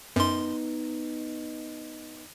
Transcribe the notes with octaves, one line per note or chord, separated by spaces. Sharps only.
F#2 B3 D#4 C6